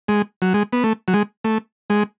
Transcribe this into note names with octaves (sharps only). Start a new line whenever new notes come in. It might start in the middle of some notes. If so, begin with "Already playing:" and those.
G#3
F#3
G#3
B3
A3
F#3
G#3
A3
G#3